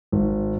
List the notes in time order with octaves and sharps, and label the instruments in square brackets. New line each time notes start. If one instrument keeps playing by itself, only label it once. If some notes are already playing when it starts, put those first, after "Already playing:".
[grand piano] G#1